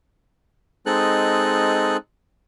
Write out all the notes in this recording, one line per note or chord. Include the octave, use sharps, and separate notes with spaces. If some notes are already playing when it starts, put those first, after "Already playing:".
G#3 C4 D#4 A4 F#6